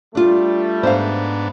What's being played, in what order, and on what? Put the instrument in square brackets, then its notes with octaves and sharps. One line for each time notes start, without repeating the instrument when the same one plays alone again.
[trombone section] G3 A3 [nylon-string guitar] D4 F4
[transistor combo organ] G#2 B3 D4 [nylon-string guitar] C5 F5